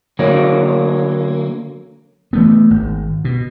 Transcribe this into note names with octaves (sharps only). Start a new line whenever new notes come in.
D3 F#3 A#3
E3 A3 B3
G#1
B2